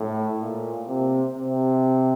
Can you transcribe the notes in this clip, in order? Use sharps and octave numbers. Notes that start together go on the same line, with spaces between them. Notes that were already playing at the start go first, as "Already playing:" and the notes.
Already playing: A2
A#2
C3
C3